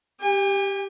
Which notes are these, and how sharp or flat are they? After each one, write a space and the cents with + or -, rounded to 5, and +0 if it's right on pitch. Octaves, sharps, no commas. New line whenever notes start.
G4 +0 G#5 -45